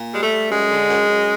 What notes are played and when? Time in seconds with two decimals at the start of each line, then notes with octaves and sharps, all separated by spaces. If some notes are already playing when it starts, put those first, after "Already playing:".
Already playing: A#2
0.13 G3 G#3
0.23 A3
0.32 G3
0.51 F#2 G#3
0.71 D3
0.90 F#2
1.09 F#2